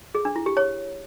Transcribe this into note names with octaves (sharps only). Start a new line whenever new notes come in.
G#4
D4
E4
G4
C#5